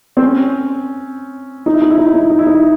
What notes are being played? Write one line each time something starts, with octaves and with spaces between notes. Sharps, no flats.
C4
C#4
D#4
E4
D#4
E4
D#4
E4
D#4
E4
D#4
E4
D#4
E4